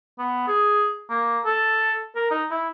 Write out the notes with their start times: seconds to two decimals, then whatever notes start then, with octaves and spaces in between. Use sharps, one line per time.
0.19 B3
0.48 G#4
1.10 A#3
1.45 A4
2.16 A#4
2.31 D#4
2.51 E4